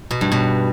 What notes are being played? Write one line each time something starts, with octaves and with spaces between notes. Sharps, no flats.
B2
G2
B2